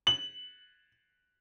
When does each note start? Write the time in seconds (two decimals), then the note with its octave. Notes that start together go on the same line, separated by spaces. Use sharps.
0.07 F#7